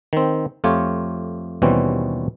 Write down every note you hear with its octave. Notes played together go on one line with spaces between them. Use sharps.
D#3 C4
F2 A3 F4 G4 C#5
D#2 B2 E3 G3 C4 C#4